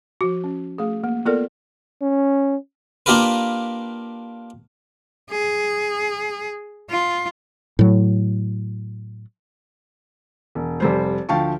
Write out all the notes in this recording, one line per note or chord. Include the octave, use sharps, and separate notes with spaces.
F3 F#4
C#4
A3 G#4
A#3
B3 F4 A4 A#4 D5
C#4
A#3 D4 F4 G4 A#4 B4
G#4
F4
A2 F#3
E1
F1 G3 C5
D2 F3 F5 G5 A5 C#6